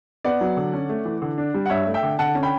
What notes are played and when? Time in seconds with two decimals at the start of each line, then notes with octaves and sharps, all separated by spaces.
0.24 B3 D5 F#5
0.41 F#3
0.57 D3
0.73 C#4
0.89 A3
1.05 E3
1.22 D3
1.38 D4
1.54 G3
1.66 F#5
1.70 G2 C#5 E5
1.87 A3
1.94 E5 G5
2.03 D3
2.19 D3 F#5 A5
2.35 C#4
2.43 G5 B5